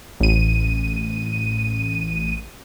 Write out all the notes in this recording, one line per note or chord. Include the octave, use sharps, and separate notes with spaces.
A1 D#7